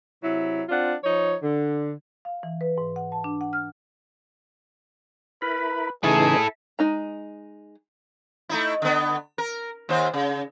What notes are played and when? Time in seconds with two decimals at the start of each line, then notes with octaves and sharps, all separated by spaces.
0.22 C3 F#3 E4
0.69 C4 D4 F4 F#5
1.04 F3 D#4 C#5
1.42 D3
2.25 F5
2.43 E3
2.61 B4
2.78 G#2
2.96 F#5
3.12 A5
3.24 D4
3.41 F#5
3.53 F6
5.42 E4 A#4 B4 B5
6.04 C#3 E3 D#4 E4 G#4 A4
6.79 G#3 D#4 A#5
8.49 A3 D#4 E4
8.82 D3 B3
9.38 A#4
9.89 D#2 C5
10.13 C#3